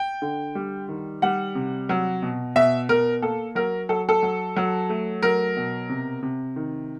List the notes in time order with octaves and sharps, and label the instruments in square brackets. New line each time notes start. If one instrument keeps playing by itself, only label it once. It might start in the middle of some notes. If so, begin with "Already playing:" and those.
Already playing: [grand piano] G5
D3
G3
D#3
G3 F#5
C3
F#3
B2
B2 E5
B2 A#4
A#3 A4
F#3 A#4
F#3 A4
A4
F#3
F#3
A3
F#3 A#4
B2
C3
C3
D#3